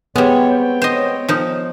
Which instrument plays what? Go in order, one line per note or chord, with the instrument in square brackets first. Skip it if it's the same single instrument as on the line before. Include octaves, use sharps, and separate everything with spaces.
[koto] G3 G#3 [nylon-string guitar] B3 [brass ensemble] C#5
[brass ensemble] C4 C#5 G5
[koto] C5 D#5
F3 D#4